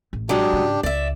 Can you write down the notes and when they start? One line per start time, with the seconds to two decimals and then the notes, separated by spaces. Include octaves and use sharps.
0.13 A1
0.29 F#3 G#3 D4 G4
0.53 G#2 C#3
0.83 C#2 D5 E5